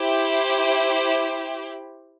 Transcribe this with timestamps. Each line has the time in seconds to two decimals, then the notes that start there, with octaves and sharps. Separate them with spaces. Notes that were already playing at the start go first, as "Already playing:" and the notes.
Already playing: E4 G4 C5